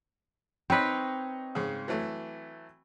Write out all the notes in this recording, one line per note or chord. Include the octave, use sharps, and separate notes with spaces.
C4 D#4 B4 C#5
G#2 C#3
E3 F#3 A3